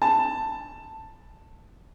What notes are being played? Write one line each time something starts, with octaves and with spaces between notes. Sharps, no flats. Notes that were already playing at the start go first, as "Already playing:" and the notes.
A5